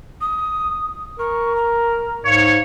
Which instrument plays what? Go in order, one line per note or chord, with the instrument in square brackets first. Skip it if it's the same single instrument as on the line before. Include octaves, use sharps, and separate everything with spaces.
[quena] D#6
[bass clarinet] A#4 [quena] C#6
[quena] A#5
[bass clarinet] G#2 [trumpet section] C#5 [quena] F5